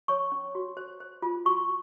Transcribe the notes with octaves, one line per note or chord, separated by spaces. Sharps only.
C#5 C#6
C#4
F#4
C5
C5
F4
F#4 C#6